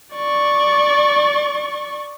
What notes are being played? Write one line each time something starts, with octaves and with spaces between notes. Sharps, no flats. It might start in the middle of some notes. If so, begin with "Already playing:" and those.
D5 C#6